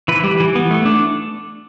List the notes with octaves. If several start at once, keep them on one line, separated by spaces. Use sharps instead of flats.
E3 B4
G3
E3
B3
A3
D4